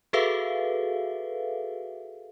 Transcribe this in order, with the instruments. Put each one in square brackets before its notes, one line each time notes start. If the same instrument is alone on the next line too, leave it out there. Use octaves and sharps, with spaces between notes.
[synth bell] F#4 G#4 A4 B4 E5 F5